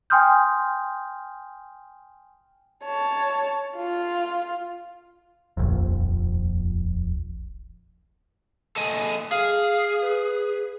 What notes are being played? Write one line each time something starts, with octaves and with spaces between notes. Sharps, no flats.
G5 G#5 C6 D#6 F6 G6
C#5 A5
F4
D#1 A#1 F2
A4 D#5 G#5
G#4 F5
B4